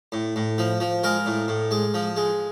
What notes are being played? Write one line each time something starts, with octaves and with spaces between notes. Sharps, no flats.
A2
A2
F3
F3
G#3 A#4
A2
A2
G#3
F3
G#3